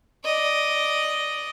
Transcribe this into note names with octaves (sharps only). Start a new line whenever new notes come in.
D5 D#5